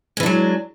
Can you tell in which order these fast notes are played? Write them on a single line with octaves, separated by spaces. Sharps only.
G#3 E3 D4 F#3